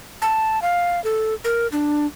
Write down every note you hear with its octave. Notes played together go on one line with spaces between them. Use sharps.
A5
F5
A4
A#4
D4